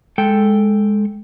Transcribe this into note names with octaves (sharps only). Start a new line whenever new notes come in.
G#3 A4 G5